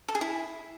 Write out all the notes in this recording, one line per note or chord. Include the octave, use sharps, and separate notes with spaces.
A4
G#4
E4